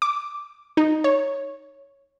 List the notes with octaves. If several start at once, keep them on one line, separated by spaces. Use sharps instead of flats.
D6
D#4
C#5